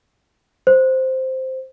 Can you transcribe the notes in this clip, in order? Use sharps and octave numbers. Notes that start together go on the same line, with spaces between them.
C5